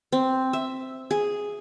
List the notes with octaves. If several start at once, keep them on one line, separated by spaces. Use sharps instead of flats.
C4
E5
G#4